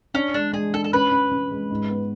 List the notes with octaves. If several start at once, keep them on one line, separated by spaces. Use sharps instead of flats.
C#4 D4
G#3 D4
G#3 G#4
D4 A4
A4
C#4 B4
C#4
C#4
G#3
G#2
B3